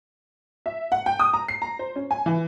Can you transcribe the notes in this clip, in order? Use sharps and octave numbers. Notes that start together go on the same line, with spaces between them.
E5
F#5
G5
D#6
A#5
C7
A#5
C5
C#4
G#5
E3